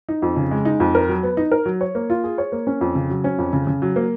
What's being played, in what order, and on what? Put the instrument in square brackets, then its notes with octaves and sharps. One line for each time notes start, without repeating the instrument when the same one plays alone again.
[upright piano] D#4
F2
C#3
G#3
D#4
F2
A#4
F#3
B3
D#4
A#4
F#3
C#5
A#3
F4
G#4
C#5
A#3
C#4
F2
C#3
F#3
C#4
F2
C#3
C#3
F#3
A#3